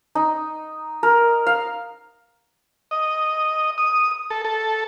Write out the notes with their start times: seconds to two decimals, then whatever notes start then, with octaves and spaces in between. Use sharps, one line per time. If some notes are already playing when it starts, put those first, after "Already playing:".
0.15 D#4
1.03 A#4
1.46 F5
2.91 D#5
3.78 D#6
4.30 A4
4.45 A4